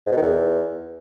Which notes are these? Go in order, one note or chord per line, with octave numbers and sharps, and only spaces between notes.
G#2
B2
D#3
E2